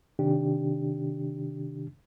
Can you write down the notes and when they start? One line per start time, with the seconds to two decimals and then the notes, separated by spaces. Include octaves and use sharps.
0.19 C3 D#3 D4 G4